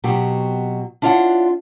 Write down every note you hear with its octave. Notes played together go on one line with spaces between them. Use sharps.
B2 F#3 C4 G4
D4 E4 F4 C#5 F#5